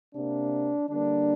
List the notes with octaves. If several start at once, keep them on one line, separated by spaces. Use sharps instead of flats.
C3 A#3 D4
D3 G3 A#3 D4